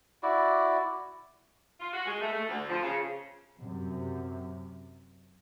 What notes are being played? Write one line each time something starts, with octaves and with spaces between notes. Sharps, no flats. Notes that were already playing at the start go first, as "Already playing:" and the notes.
E4 F#4 D5
F4
F#4
G#3
A3
A3
D2
F3
C#3
F#2 C3